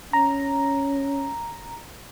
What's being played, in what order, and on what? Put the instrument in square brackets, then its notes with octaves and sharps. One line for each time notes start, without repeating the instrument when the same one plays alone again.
[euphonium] C#4 [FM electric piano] A#5